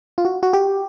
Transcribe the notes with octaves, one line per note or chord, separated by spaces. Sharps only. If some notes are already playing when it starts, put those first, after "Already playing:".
F4
F#4
F#4
G4